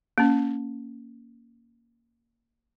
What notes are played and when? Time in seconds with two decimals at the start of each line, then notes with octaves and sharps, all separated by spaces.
0.18 A#3 C#4